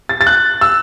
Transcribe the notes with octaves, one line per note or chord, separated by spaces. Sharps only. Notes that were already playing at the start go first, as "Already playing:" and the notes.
A6
A6
F#6
E6